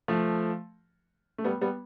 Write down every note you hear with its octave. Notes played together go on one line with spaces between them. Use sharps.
F3 A3
A3
G3 B3
G3 B3